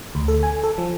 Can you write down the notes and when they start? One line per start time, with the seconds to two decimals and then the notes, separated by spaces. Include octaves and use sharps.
0.15 D2
0.28 A4
0.43 G#5
0.63 A4
0.78 F3